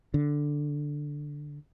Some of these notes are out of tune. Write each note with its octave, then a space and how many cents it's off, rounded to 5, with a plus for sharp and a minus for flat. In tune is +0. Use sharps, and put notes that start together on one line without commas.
D3 +0